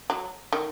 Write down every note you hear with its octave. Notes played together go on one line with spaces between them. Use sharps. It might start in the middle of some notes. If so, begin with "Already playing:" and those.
F#3
D#3